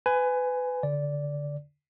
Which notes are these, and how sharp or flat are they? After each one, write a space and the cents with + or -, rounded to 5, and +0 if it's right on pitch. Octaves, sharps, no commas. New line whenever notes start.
B4 +25 G#5 +0
D3 -25 D5 -10